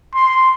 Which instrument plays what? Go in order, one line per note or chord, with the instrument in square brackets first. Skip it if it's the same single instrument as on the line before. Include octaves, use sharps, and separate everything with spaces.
[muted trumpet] C6